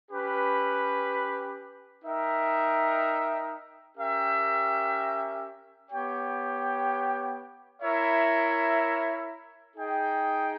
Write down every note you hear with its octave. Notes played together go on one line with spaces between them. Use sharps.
C#4 G4 B4
D#4 A#4 E5 G5
C#4 G4 A#4 E5 G5
B3 G4 C#5 G5
E4 A#4 C#5 E5
D#4 G#4 D#5 G5